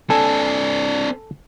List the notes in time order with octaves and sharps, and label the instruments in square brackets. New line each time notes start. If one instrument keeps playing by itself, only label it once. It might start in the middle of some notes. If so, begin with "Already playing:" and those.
[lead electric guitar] C4 D4 [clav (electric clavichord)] A4 G#5